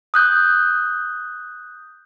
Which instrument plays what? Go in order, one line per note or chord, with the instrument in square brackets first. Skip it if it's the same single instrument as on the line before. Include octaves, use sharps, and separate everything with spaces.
[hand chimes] D#6 F#6 G6